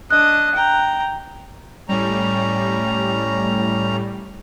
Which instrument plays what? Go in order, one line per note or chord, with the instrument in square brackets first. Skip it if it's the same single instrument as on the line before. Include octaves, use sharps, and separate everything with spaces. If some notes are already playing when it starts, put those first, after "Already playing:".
[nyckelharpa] D4 D#5 [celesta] F#6
[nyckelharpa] G5 A#5
[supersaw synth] A2 G3 [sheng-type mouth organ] C#4 A#5